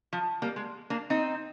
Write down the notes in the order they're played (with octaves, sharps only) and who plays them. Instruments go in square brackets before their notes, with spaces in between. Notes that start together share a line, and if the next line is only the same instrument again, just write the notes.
[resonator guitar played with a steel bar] F3
G3 A#3
G#3
A#3 D4
C4 D#4